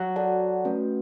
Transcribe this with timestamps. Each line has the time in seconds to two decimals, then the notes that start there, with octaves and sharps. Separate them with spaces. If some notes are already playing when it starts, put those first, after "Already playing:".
Already playing: F#3
0.16 F#4 A4 D5 F#5 A5
0.65 A3 C#4 F#4 B4